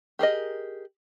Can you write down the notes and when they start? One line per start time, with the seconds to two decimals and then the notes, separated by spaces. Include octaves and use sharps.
0.19 G4 G#4 A#4 D#5